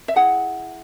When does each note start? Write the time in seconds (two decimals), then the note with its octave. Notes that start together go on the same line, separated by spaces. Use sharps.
0.08 E5
0.16 E4 G#4 F#5